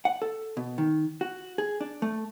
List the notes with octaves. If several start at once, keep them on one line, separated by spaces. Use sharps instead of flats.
F#5
A4
B2
D#3
F#4
G#4
D4
A3